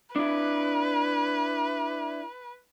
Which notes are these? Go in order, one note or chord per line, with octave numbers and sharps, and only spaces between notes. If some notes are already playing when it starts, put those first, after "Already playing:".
D4 E4 B4